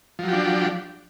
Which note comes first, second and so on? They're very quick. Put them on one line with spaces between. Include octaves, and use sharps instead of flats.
F3 F#3 G4 D4